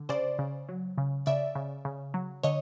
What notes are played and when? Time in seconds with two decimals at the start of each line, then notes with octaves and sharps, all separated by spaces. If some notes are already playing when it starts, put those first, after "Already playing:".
Already playing: D3
0.09 C#3 C5 D5
0.39 C#3
0.69 F#3
0.98 C#3
1.26 C#3 D5 E5
1.55 C#3
1.85 C#3
2.14 F#3
2.43 D3 C#5 D#5